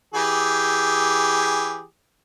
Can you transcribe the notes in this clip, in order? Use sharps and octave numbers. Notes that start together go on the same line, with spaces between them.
E3 G4 G#4